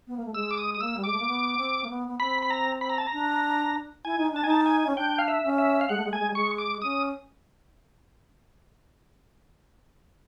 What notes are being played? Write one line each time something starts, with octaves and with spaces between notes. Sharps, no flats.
B3
A#3
A3
G#3 E6
D6
D#6
D#6
A#3 E6
G3
G#3 D6
A3
A#3
B3
C4
A#3
B3
B3
C4 B5
B5
A#5
B5
A#5
A5
A#5
D4
E4 G#5
D#4
D4 A5
D#4 G#5
A5
G#5
C#4
D4 G5
F5
E5
C#4
E5
F5
G#3 F#5
A3
G#3
A3 G#5
G#3
G3
G#3 C#6
D6
C#4 D#6